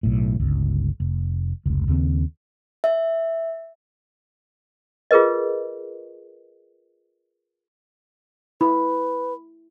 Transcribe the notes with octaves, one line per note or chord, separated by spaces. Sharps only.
B1 A2
G1 C#2
F1
F1 C#2
D#2 C#3 C4
E5
F4 G#4 A#4 B4 D#5
E4 B4 B5